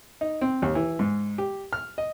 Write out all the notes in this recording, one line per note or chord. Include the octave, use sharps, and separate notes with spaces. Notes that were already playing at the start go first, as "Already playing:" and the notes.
D#4
C4
D#2
E3
G#2
G4
F6
D#5